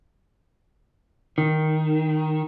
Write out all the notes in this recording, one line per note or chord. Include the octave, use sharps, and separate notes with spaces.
D#3